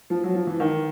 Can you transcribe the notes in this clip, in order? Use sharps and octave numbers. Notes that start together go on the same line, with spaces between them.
F3
F#3
F3
E3
D#3